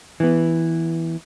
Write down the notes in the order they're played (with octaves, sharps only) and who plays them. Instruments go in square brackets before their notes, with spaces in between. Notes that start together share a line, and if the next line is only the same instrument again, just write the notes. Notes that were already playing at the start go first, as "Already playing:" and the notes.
[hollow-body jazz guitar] E3 B3